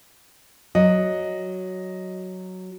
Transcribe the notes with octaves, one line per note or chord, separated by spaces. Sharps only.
F#3 D#5